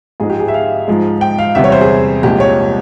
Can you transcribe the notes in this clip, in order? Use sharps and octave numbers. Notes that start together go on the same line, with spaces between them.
G#2 F3 G#3 G#4
G4
G#4
E5
F5
G#2 F3 G#3
G5
F5
E2 C3 G3 E5
C#5
C5
G#4
C2 A#2 F3 G#3 G4
C#5